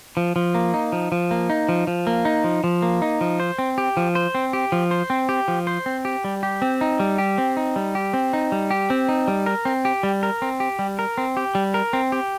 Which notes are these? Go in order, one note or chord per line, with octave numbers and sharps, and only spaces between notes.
F3
F3
A#3
D#4
F3
F3
A#3
D#4
F3
F3
A#3
D#4
F3
F3
A#3
D#4
F3
C5
C4
G4
F3
C5
C4
G4
F3
C5
C4
G4
F3
C5
C4
G4
G3
G4
C4
D#4
G3
G4
C4
D#4
G3
G4
C4
D#4
G3
G4
C4
D#4
G3
A#4
C4
G4
G3
A#4
C4
G4
G3
A#4
C4
G4
G3
A#4
C4
G4